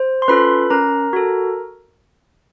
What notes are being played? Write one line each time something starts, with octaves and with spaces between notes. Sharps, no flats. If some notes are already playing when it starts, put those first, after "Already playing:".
Already playing: C5
C6
C#4 F4 A4 B4 B5
C#4 A#4 A#5
F#4 A4